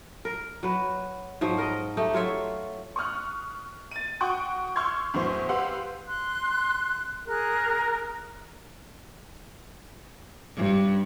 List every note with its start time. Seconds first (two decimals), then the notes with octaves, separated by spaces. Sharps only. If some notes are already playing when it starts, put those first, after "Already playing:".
0.25 A#4
0.63 F#3 B4
1.41 G#2 F3 F#3
1.58 A#4 D#5
1.97 A3 D#4 G4
2.13 F#3 F4 C#5 E5
2.96 C#6 D#6 F6 F#6
3.91 A6 D#7
4.21 F#4 G5 C#6 D#6 F#6
4.76 C6 C#6 E6 F6 G6 G#6
5.14 E2 A2 F#3 C5
5.49 G4 B4 F5 F#5 C6 E6
6.07 C6 F#6
7.27 G#4 A#4 F#6
10.57 G2